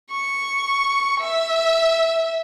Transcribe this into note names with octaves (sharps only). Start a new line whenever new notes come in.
C#6
E5